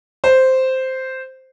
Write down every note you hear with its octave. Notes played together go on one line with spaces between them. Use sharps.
C5